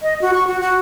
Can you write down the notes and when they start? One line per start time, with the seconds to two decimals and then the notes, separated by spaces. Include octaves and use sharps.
0.01 D#5
0.22 F#4
0.34 C#6
0.47 F#4
0.60 F#4